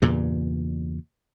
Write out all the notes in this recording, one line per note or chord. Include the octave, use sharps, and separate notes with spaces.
E2 G2 A#2 C#3